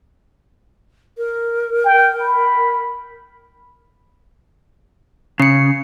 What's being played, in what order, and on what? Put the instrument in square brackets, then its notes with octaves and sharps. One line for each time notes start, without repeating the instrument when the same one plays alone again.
[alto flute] A#4
[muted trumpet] G5
B5
[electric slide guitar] C#3 [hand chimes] C7 C#7